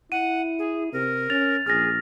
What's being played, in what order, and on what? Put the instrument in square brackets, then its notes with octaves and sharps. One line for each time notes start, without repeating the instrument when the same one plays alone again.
[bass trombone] E4 [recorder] F#5 [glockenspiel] D#7
[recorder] G#4
[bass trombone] C3 [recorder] A#4
[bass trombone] C#4 [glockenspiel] A6 F7
[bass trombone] A#1 [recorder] G#4 [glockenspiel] F6 A#6